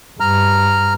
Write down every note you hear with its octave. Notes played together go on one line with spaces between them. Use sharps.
G2 A#5 F6